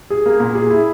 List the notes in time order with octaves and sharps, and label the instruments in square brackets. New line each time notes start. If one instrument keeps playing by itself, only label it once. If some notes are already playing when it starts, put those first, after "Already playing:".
[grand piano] G#4
A#3
A#2
G#4
E4